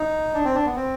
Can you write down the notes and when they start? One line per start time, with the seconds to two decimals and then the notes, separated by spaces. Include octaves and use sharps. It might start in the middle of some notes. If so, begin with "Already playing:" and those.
Already playing: D#4
0.34 D4
0.45 C4
0.55 D4
0.66 B3
0.76 C4